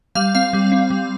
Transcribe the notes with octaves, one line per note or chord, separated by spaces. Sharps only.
G3 F5
C4 F5
G3
C4
G3